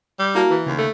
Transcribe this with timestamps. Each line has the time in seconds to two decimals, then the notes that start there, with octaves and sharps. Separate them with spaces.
0.19 G3
0.35 A#3 E4 F#4 A5
0.51 E3
0.66 D#2 C#3
0.78 A3